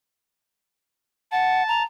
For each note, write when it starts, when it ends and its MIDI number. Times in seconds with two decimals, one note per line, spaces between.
1.32 1.63 78
1.32 1.83 81
1.68 1.84 82